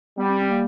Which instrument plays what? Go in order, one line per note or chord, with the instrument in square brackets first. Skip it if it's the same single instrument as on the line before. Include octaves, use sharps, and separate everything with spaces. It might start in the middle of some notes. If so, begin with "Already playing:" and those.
[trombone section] G3 [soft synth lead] B3
[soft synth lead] C4
C4
A#3